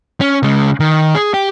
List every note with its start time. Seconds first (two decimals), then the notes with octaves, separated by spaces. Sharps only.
0.21 C#4
0.43 C#3 G#3
0.80 D#3
1.15 G#4
1.34 G4